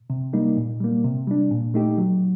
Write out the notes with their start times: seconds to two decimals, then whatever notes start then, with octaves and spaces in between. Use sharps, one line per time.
0.10 C3
0.33 G3 A#3 D#4
0.57 A#2
0.80 G3 A#3
1.04 C3
1.27 G3 D4
1.51 A#2
1.74 A3 D#4 G4
1.98 F#3